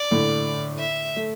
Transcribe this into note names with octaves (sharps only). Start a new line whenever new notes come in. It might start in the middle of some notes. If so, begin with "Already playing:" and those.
Already playing: D5
A2 D3
E5
A3